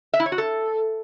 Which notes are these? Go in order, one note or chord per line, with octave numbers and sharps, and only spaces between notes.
E5
E4
C#5
F#4
A4